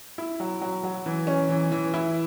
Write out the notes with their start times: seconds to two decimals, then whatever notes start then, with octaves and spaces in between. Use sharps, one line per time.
0.18 E4
0.40 F#3
0.62 F#3
0.84 F#3
1.06 E3
1.27 C#4
1.49 E3
1.72 E3
1.94 E4